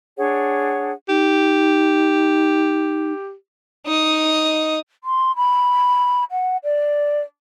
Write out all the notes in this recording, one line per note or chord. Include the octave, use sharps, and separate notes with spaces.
D4 G#4 C#5 F#5
D#4 G4
D#4 D#5
C6
B5
F#5
D5